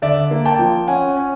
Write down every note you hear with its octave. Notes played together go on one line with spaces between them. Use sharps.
D3 D5 E5
A#3
G5 A5
F3
C#4 F#5 G#5
C#4